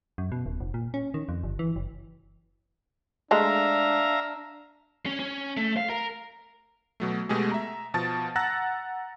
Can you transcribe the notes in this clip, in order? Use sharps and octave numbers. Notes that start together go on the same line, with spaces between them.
F#2
B2
D#1
F1
A#2
C#4
D#3
F2
G1
E3
F#1
G#3 A3 D4 E5 F5 A#5
C#4
C#4
A3
F5
A#4
B2 F#3 A3
B2 G#3 A3 G4 G#4
E5 A#5
B2 F3 A5 A6
F#5 A#5 E6 F#6 A6 A#6